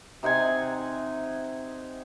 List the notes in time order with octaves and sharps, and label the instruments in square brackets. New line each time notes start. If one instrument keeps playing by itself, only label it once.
[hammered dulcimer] C3 D#4 F#5 G#5